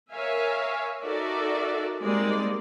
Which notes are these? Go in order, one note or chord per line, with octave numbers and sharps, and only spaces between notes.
A#4 C#5 E5 F5 G#5
D#4 F#4 A4 A#4 D5 E5
G3 G#3 A#3 C4 D#4 D5